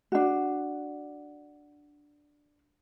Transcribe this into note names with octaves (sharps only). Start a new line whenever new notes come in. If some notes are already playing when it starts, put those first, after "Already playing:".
D4 F#4